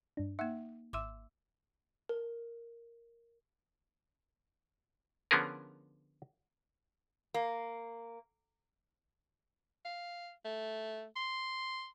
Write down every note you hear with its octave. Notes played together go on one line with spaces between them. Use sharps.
G2 D4
A#3 D#4 E5 F#5
G#1 E5 C6 D6 E6
A#4
D3 F3 B3 C#4 G#4 A#4
A#3
F5
A3
C6